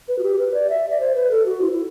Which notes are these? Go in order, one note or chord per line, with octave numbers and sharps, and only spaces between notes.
B4
F#4
G4
B4
D5
E5
D5
C5
B4
A4
F#4
E4
E4